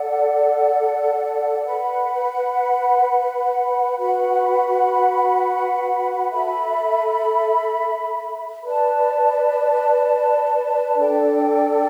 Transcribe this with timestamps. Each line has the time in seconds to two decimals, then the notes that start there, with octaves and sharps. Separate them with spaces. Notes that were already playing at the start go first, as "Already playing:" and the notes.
Already playing: A4 D5 F#5
1.65 B4 F#5 B5
3.98 F#4 B4 F#5 B5
6.31 A4 E5 B5
8.63 B4 D5 A5
10.96 D4 A4 D5 G5